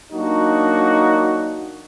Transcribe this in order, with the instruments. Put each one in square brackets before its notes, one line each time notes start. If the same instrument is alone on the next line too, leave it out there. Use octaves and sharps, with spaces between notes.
[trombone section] F#3 A#3 D4 D#4 F#4